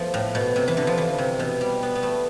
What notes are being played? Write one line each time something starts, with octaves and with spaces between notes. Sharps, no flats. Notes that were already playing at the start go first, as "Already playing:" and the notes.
Already playing: F3 A3 B3
A2
B2
C3
E3
D3
F3
E3
C3
B2
G3
B3
B3
A3